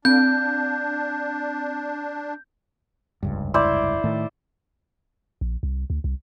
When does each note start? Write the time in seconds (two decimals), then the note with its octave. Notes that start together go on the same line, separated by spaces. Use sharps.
0.05 C4 D4 G6
3.23 F1 C#2 G2
3.54 E4 C5 D5
4.04 A2 D#3 A3
5.41 A#1
5.63 C2
5.90 D2
6.04 C2